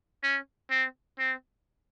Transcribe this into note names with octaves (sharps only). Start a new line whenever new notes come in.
C#4
C4
C4